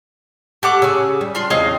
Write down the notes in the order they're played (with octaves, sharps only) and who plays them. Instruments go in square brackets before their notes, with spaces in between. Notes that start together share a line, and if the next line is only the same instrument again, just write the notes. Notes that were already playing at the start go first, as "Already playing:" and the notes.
[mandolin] A3 F#5 D6 [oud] G4
[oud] C#3 [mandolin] G#5 E6
[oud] G3
[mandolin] D4 F4 C6
[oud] E2 C#3 C4 [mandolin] G#4 D#5 F5